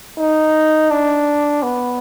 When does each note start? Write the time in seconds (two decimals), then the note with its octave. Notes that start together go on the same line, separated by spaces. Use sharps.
0.19 D#4
0.91 D4
1.63 B3